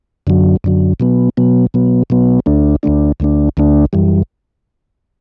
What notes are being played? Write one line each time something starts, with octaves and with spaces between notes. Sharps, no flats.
F#2 D3 F#3
F#2 D3 F#3
B2 F#3 B3
B2 F#3 B3
B2 F#3 B3
B2 F#3 B3
D2 D3 A3 D4
D2 D3 A3 D4
D2 D3 A3 D4
D2 D3 A3 D4
F#2 E3 G3